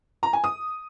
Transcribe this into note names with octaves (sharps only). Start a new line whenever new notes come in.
A#5
G#5
D#6